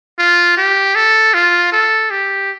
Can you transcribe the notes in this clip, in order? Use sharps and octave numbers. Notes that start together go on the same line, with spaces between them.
F4
G4
A4
F4
A4
G4